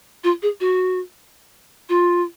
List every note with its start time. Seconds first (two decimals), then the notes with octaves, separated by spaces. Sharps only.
0.24 F4
0.43 G#4
0.60 F#4
1.89 F4